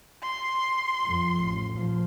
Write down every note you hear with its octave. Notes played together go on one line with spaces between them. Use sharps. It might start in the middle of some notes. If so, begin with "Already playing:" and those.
C6
F2 F3
A1
A#2 F3